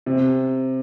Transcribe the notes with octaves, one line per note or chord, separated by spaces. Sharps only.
C3